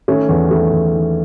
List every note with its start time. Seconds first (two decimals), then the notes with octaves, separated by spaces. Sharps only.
0.08 D#3 A3 C#4
0.29 E2
0.51 D#3 A3
0.72 E2
0.93 D#3